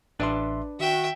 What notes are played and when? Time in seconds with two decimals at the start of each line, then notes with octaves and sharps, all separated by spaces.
0.20 A1 D4 B4 D5 E5 C6
0.80 D#3 F#4 E5 G5